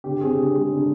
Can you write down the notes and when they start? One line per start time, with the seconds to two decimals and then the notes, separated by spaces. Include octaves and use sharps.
0.04 D3 G4
0.21 C4 G#4
0.38 D3 G4
0.55 G#3
0.72 D3